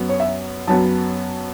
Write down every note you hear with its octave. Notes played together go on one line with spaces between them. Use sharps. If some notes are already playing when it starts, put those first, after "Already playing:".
Already playing: F#2 F#3 B3
C#5
E5
F#2 F#3 B3 A5